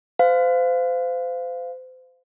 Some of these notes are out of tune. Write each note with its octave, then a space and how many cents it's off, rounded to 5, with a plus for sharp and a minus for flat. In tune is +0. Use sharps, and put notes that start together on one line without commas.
C5 -35 F5 +0